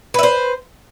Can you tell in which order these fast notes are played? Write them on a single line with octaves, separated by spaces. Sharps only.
B4 E5 C5